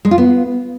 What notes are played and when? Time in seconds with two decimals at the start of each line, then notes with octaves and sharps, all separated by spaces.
0.05 G#3
0.11 F4
0.18 B3